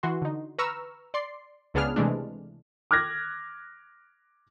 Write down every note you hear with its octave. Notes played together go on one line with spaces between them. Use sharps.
E3 F#4 C6
D3 D#4
B4 A#5 C#6 E6 F6
D5 C6 C7
C#2 C#3 B3 D4 G#4 F6
C3 E3 G#3 A3 D4
D6 F6 F#6 G#6 A#6